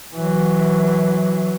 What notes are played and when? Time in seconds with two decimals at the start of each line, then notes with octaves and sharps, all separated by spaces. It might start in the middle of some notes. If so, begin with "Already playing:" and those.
0.15 E3 F#3